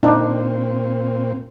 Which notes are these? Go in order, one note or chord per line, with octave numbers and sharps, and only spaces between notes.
A#2 C4 D4 D#4